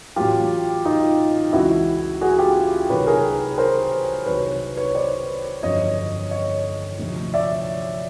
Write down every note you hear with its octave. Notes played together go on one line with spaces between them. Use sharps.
A1 A2 F#3 F4 G4
D#4 F4
C#2 C#3 E3 E4 F#4
F#4 G#4
F4 G4
C2 C3 D#3 F#3 B4 C#5
G#4 A#4
A#4 C5
C2 C3 D#3 F#3 B4 C#5
B4 C#5
C5 D5
G1 F2 C#3 F#3 C#5 D#5
C#5 D#5
D2 C3 F3
D5 E5